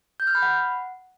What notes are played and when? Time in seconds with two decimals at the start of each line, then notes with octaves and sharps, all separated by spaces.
0.20 G6
0.27 F6
0.35 B5
0.42 F#5